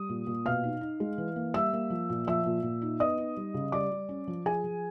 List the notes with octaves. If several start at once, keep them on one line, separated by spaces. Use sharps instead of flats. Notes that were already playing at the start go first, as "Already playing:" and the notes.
Already playing: G3 D#6
A#2
A#2
B2 F5 F6
D#4
D#4
G#3
E3
A#3
G3 E5 E6
A#3
F3
A#2
F3 E5 E6
A#2
A#2
D#4
B3 D#5 D#6
D#4
G3
C#3
G3 D5 D6
G3
C#4
F3
F3 G#4 G#5
F3